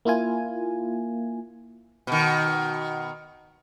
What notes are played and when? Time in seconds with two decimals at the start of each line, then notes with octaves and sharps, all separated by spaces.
0.05 A#3 E4 F4 G#5
2.07 B2 D#3